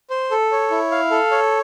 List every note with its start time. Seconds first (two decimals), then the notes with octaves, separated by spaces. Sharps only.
0.10 C5
0.31 A4
0.52 C#5
0.71 E4
0.91 F5
1.11 A4
1.31 C#5